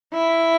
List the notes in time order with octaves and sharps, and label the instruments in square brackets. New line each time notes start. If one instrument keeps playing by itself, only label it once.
[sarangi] E4